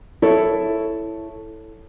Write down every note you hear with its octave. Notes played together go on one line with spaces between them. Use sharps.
E4 A4 C#5